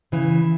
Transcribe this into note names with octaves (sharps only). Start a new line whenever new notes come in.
C#3 E3